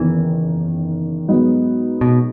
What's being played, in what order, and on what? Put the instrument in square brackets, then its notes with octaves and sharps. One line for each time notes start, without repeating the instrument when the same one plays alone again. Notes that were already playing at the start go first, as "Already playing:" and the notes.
Already playing: [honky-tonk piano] F#1 E2 D#3 [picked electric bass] E3
[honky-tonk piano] G#2 F#3 B3 D#4
[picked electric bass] B2